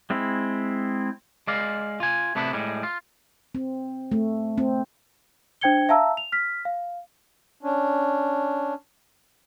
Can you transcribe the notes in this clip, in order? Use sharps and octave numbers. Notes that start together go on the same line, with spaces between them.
G#3 C4 E4
G#3 D5 F5
F4 G#5
C3 A3 B3 D4 E4
A2 G3 G#3
F4
C4
A3
C4
D4 C5 G5 G#6 C#7 G7
E5 F5 A5 A#5 E6
F7
F6 B6
F5
C#4 D4